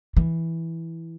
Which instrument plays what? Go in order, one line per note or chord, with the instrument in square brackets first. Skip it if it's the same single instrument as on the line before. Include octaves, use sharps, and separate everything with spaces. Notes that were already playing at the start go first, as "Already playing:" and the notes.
[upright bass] E3